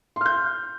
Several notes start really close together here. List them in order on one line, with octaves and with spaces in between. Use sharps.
C6 F6 G6